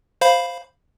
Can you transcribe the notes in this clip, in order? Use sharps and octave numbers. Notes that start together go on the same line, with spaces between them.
C5 F5 B5